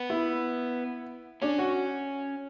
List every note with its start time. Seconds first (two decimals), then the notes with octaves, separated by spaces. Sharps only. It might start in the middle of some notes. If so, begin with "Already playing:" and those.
Already playing: B3
0.10 E4
1.42 C#4 D4
1.59 F#4